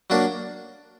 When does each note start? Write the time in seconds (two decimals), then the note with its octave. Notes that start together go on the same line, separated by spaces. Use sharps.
0.10 F#3 A#3 D4